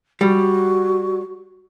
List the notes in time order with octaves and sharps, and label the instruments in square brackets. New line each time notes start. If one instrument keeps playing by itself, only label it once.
[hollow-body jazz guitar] G3 [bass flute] F#4